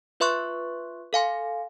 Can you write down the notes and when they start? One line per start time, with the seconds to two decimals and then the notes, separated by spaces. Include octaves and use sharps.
0.20 F4 B4 E5 C6 C#6 F#6
1.13 A4 F5 G#5 C6